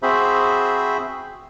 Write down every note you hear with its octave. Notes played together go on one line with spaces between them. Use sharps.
C4 F#4 G#4 C5 E5 B5